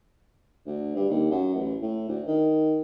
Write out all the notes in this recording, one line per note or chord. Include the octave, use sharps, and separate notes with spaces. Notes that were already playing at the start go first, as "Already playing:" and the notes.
D2
G2
D#2
F#2
A1
A2
D2
D#3